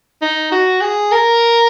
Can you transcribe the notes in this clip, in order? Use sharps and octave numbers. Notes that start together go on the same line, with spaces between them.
D#4
F#4
G#4
A#4